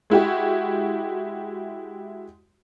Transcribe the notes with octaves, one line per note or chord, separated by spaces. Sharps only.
G#3 E4 F#4 G4